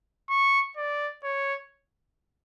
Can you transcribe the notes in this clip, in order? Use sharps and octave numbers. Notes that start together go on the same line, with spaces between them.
C#6
D5
C#5